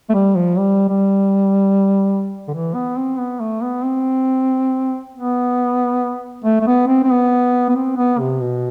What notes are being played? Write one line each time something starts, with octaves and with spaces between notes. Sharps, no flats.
A3
G3
F3
G3
G3
D3
E3
B3
C4
B3
A3
B3
C4
B3
A3
A3
B3
C4
C4
B3
B3
C4
B3
C3
B2